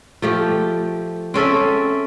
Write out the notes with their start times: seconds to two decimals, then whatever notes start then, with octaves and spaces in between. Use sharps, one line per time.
0.22 F3 A3 G4
1.34 C4 C#4 A4 E5